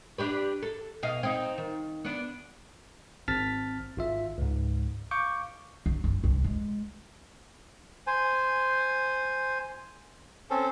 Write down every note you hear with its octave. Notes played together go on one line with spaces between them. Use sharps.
D4 G4 B4
A4
B2 D#5 F5
C4 D#4
D#3
B3 D4
G#1 C4 A5 F6 A6 B6
G#1 F4 E5
C#2 G#2
F5 C#6 D6 G6
F#3
F#1
C2
G#3
C5 G#5
C4 C#4 A4